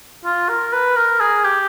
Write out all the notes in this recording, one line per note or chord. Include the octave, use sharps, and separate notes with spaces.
F4
A#4
B4
A#4
G#4
G4